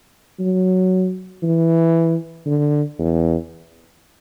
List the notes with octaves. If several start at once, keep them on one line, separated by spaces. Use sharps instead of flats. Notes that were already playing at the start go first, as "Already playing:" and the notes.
F#3
E3
D3
E2